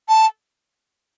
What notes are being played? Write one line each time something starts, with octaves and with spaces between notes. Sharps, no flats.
A5